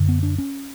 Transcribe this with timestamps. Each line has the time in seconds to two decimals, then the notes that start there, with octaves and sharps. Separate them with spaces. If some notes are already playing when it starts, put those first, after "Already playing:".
Already playing: F#2 D3
0.08 B3
0.23 D4
0.38 C#4